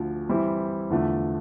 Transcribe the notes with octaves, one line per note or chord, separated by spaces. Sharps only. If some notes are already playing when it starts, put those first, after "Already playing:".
Already playing: D2 D3 F3
E3 G3 C4 E4
E2 D3 F3 A3